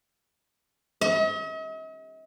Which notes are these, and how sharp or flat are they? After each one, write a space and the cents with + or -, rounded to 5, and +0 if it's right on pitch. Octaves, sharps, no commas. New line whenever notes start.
D#5 +45